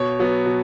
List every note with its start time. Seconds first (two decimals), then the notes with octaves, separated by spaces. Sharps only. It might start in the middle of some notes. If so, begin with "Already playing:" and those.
Already playing: B2 C#5
0.19 F#3 B3
0.46 B2